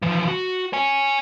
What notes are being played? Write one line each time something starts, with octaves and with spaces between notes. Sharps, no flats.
E3 F3
F#4
C#5 G#5